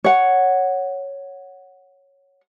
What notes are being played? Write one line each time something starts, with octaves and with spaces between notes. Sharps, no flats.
C#5 F#5